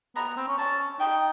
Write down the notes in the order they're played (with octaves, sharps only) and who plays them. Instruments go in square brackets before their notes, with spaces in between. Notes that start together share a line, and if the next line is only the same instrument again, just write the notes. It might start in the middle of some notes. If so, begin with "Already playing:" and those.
[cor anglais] B3 [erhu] A#5
[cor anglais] B3
C4
C#4
[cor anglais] C#4 [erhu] A5
[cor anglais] D#4 [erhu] G5